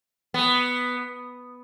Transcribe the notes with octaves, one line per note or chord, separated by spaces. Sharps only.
B3